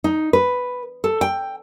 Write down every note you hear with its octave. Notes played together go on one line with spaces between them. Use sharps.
D#4
B4
A4
G5